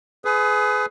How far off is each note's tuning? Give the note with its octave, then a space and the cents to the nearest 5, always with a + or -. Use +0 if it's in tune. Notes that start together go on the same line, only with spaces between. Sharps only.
G#4 +25 B4 +30 D#6 +0